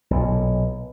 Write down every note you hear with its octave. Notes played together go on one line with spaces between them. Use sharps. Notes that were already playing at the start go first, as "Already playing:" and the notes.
B1 A#2